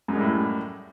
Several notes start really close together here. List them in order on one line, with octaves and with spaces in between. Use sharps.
F#2 G#3 G3 A2